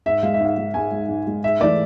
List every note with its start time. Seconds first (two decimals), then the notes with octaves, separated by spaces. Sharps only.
0.06 G#2 E5
0.23 G#3 F5
0.34 E5
0.41 G#2 F5
0.57 G#3
0.74 G#2 G#5
0.91 G#3
1.09 G#2
1.27 G#3
1.43 G#2 E5
1.60 E3 A3 D5